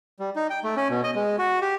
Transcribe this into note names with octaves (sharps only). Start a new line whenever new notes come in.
G3
D#4
G5
A3
C#4
B2
D#5
G#3
F#4
G4